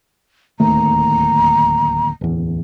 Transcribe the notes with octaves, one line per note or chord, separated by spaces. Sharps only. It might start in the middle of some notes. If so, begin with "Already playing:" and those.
D1 D#2 A3 A#5
D1 E2